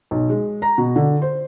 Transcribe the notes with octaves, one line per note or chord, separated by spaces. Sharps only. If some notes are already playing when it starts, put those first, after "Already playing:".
B1
G#3
A#5
B2
D3
C5